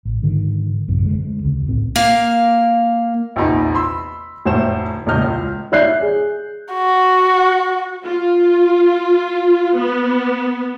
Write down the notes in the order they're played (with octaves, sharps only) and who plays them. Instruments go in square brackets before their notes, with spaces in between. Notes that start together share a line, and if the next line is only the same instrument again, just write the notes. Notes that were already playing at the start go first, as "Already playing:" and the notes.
[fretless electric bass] A1
G#2 D3 D#3
A1 F#2 C3
D2 D3 G#3
D2 C#3
B1 A2 C4
[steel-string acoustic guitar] A#3 F5
[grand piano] A#1 E2 C3 D#4 B5
B5 C6 E6
F1 D2 A2 C5 E7
E1 A2 C#3 D#5 F6 G6
C#2
[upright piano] C#5 D5 E5 F#6 G6 C7
G#4
[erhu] F#4
[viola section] F4
B3